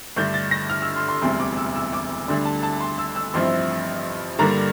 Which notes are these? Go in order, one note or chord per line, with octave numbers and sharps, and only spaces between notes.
G2 D3 A3 D4 G6
A6
A#6
F6
E6
C6
C6
E1 D2 C3 G3 C6
D6
E6
E6
D6
D2 D3 G3 D4 C6
A5
A5
C6
E6
E6
A1 G2 F3 C4 E4 C6
G2 D3 G3 A#3 D4 A#5